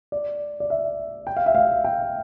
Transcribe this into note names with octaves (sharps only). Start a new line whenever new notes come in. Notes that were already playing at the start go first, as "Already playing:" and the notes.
D5
D5
E5
G5
F5
E5
F5
G5